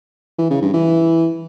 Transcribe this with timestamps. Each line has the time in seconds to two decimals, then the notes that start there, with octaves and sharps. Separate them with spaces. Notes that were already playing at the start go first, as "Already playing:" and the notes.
0.38 E3
0.50 C#3
0.62 G2
0.73 E3